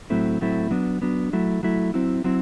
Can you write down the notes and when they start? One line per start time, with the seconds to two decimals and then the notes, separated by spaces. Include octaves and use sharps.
0.10 A2 F#3 A3 C4 E4
0.41 A2 F#3 A3 C4 E4
0.70 F#3 B3 D4
1.02 F#3 B3 D4
1.33 F#3 A3 E4
1.63 F#3 A3 E4
1.94 F#3 C4 E4
2.24 F#3 C4 E4